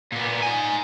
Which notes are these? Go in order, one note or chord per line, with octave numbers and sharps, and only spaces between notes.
A#2 B3
D#4 G#5